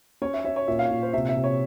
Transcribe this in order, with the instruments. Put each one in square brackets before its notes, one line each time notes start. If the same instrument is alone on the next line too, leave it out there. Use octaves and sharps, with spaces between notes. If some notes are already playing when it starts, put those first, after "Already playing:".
[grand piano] C#4 [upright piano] C#5
[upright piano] E5
[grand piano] C#4 [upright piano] E5
[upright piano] C#5
[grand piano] A#2 [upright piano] E5
[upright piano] F5
[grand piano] A#2
[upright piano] C5
[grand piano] C3 [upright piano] E5
[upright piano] E5
[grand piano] C3
[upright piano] C#5